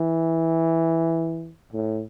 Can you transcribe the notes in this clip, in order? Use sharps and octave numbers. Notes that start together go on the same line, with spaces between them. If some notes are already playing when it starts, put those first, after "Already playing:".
Already playing: E3
A2